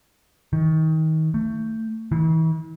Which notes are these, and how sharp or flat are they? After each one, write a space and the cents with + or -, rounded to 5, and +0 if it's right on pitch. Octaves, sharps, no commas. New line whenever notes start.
D#3 +25
A3 +25
E3 -45